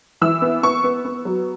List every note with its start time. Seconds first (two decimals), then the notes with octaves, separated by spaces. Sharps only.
0.21 E3 E6
0.42 B3
0.63 B3 C#6
0.84 B3
1.05 B3
1.25 F#3